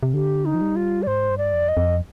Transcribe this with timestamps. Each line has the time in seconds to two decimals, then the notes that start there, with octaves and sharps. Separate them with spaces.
0.03 C3
0.14 D3 G4
0.45 D#4
0.54 F3
0.61 G3
0.76 F4
1.03 D5
1.07 G#2 C5
1.30 G2
1.38 D5
1.53 F2
1.68 D#5
1.77 F2